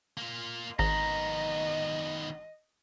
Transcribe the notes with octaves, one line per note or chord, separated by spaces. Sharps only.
A#3 F4
G#1 D#3 B3 D#5 A#5